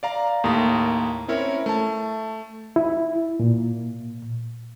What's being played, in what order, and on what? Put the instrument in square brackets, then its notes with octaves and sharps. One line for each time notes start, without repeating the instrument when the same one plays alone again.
[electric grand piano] D5 F5 A#5
D#2 A2 A#3 A#5
C4 C#4 E4 A#4 C#5
A3 A5
[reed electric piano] E4
A#2